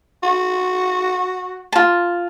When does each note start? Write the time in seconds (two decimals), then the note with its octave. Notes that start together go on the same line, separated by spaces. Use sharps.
0.23 F#4
1.72 F4 A5